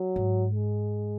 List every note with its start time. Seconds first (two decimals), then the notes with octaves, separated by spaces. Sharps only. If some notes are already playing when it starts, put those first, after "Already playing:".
Already playing: F#3
0.16 G#2
0.53 G#3